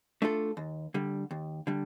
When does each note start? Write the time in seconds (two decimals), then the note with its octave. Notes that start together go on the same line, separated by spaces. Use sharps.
0.22 A3 D4 F4 A4
0.57 D#2
0.94 D3 G3
1.31 D#2
1.67 D3 G3